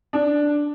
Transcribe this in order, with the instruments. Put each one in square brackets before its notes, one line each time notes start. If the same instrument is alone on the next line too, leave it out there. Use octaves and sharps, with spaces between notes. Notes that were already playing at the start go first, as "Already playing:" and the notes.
[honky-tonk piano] D4